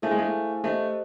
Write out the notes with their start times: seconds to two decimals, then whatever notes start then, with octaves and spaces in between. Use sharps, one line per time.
0.02 A3 E4 G#4 C5 F5 G#5
0.11 G#3
0.19 A3
0.64 A3 G4 C5 D#5